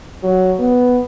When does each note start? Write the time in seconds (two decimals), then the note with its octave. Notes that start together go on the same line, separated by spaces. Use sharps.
0.23 F#3
0.59 B3